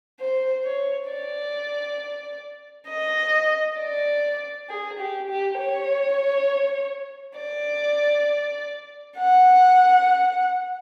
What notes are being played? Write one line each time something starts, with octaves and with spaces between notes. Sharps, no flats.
C5
C#5
D5
D#5
D5
G#4
G4
G4
C#5
D5
F#5